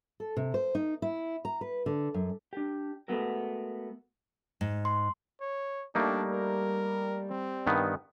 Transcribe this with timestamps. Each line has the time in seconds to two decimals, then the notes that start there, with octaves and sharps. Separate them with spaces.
0.20 A4
0.37 C3
0.54 C5
0.75 D#4
1.02 E4
1.45 A#5
1.61 B4
1.86 D3
2.14 F#2
2.53 D4 G4
3.08 G#3 A3 B3 F#4 A4 A#4
4.61 G#2
4.85 C6
5.41 C#5
5.95 G3 A3 A#3 D4 D#4
6.32 A#4
7.30 C4
7.67 G2 D#3 B3